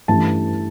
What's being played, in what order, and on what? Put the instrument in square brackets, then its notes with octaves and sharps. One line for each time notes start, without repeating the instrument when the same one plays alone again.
[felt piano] G2 E3 A3 C#4 A5